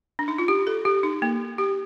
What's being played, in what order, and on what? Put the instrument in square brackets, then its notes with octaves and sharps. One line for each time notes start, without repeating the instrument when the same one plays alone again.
[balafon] D4
D#4
F4
G4
A4
G4
D#4
A#3
G4